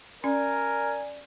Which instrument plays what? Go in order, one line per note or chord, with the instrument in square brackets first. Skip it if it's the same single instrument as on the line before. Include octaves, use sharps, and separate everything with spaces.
[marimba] C#4 [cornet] A#4 [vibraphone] D5 [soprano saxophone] G#5